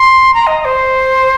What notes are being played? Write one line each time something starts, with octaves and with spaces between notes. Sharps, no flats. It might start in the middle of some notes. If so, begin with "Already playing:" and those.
Already playing: C6
A#5
D#5
D#5
C5